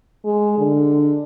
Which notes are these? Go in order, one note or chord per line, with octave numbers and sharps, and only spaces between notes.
G#3
D3